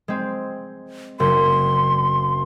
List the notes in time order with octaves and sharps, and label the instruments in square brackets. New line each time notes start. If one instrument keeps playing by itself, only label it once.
[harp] G#3 C4
[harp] F#1 [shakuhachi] C6